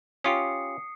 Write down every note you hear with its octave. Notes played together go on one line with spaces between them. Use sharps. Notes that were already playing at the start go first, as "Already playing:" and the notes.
C#4 F4 G4 D#6 C7 C#7